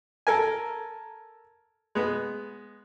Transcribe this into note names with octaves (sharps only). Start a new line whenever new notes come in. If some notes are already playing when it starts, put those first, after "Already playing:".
A4 A#4 G#5
G#3 B3